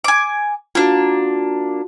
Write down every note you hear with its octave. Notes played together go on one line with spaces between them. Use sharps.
G#5 D6
A#3 D4 F4 F#4